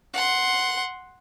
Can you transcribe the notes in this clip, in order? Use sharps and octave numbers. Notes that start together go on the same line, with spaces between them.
F#5 C6